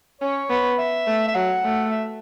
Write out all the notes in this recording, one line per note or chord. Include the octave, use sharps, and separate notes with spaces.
C#4 C#5
B3
E5
A3
E5
F#3 F#5
A3
E5